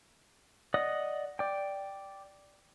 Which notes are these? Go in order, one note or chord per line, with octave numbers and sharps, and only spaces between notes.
D5 D#5 F#5 D#6
D5 G5